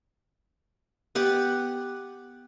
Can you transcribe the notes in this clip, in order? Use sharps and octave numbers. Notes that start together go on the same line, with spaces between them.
B3 G4 F#5